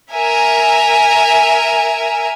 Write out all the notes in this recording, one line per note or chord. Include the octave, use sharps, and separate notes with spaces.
A#4 E5 G#5